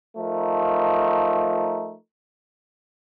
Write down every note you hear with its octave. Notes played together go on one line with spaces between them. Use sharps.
F3 A3 D#4 A#4